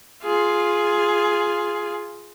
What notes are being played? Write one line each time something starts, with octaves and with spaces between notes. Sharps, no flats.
F4 G#4